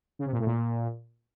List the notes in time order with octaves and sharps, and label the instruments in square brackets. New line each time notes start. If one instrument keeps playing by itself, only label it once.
[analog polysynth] C#3
C3
A#2
A2
A#2